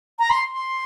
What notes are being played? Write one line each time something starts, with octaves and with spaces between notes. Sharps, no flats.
A#5
C6
C6